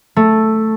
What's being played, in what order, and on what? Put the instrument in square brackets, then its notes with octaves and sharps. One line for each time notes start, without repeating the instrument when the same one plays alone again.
[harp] A3